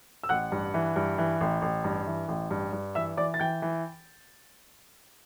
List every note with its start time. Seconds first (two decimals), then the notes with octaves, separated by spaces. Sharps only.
0.23 E6
0.29 A1 F#5 F#6
0.52 G2
0.74 E3
0.96 G2
1.18 E3
1.41 A1
1.62 A1
1.84 G2
2.07 E3
2.28 A1
2.51 G2
2.73 G2
2.95 E3 E5 E6
3.17 E3 D5 D6
3.34 A6
3.40 E3 G5 G6
3.62 E3